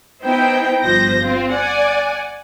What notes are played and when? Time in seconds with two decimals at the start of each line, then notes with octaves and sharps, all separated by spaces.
0.22 B3 D#4 E4 C5 G5
0.81 G1 F3 C5 G6 A#6
1.23 C4 F4
1.52 D5 F#5 G#5